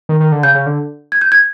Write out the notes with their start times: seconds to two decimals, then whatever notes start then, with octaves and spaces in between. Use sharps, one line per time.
0.09 D#3
0.20 D#3
0.32 D3
0.43 C#3 G6
0.55 C#3
0.66 D3
1.12 G#6
1.21 G6
1.32 G#6